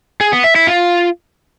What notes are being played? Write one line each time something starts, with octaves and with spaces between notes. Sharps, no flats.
G#4
B3
E5
E4
F4